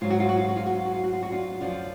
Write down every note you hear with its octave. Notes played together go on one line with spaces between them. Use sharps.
G#2 F#3 F4
F#4
F4
F#4
F4
F#4
F4
F#4
F4
F#4
F4
F#4
F4
F#4
D4 F4
F#2 D3 F3 D4 F4